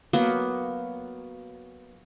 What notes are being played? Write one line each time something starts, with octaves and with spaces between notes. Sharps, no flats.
F#3 A#3 B3